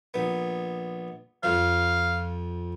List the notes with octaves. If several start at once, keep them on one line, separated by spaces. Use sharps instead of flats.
A#1 B3
F2 F3 F5